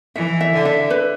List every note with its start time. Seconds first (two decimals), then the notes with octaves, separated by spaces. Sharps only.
0.16 E3 E5
0.41 E5
0.53 D3
0.65 E5
0.90 B4